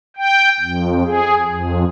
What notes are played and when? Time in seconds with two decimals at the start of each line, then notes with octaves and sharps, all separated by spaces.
0.17 G5
0.60 F2
1.04 G#4
1.46 F2